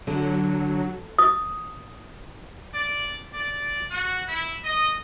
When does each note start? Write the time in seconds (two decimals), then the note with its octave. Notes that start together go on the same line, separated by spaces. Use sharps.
0.07 D3 F#3
1.19 D#6
2.74 D5
3.34 D5
3.91 F#4
4.27 E4
4.64 D#5